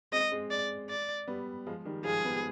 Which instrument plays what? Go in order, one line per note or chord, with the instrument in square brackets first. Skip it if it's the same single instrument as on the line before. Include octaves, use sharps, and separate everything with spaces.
[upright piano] G#3 C4 [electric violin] D#5
[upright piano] G#3 C4
[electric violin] D5
D5
[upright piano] G3 B3
F3 G#3
D#3 G3
[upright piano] F3 G#3 [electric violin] G#4
[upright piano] G3 B3